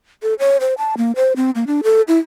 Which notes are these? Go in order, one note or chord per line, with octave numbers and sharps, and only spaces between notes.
A4
C#5
C5
A5
A#3
C5
C4
A#3
D4
A4
E4